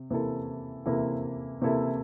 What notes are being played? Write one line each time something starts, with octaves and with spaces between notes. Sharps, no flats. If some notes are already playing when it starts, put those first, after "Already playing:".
Already playing: C3
C3 E3 A#3 E4 A4
C3 E3 A#3 E4 A4
C3 E3 A#3 E4 A4